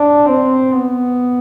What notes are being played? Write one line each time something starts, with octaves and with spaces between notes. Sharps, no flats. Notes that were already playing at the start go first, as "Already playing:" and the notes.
Already playing: D4
C4
B3